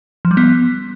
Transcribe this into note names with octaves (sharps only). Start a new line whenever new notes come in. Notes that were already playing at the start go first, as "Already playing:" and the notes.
F3
G3
B3